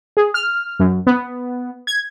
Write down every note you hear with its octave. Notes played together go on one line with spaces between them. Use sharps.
G#4
F6
F#2
B3
G#6